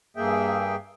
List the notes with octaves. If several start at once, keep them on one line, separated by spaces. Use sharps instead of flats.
G2 A#3 G#4 E5 G5